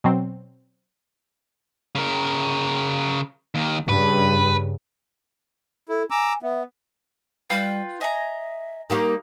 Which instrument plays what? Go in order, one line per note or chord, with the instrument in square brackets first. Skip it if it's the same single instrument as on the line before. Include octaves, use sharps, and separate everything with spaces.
[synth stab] B2 F#3 C4
[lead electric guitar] C#3 A#4
D#2 D#3
[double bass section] G2 C#3 [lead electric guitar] B4
[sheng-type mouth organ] E4 [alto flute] A4
[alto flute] G#5 [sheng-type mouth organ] A#5 D6 E6
[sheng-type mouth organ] B3 [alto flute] E5
[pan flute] G3 [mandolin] F4 B4 G5
[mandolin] D#5 G#5 A#5 [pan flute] E5
[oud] D#3 G3 A#3 [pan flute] G4